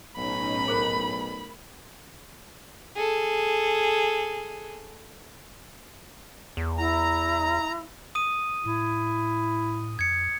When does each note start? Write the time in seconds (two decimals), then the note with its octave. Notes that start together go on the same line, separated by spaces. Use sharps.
0.17 B1 A2 C#4 D#4 B5
0.68 G#4 A#4 C5
2.96 G#4 A4
6.57 E2
6.78 E4 A#5
8.15 D#6 D#7
8.66 A2 E4
9.99 F2 G#6 C#7